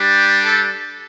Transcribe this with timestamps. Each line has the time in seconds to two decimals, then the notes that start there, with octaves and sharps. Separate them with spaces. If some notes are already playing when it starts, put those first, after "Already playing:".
Already playing: G3 D4 G4
0.45 A4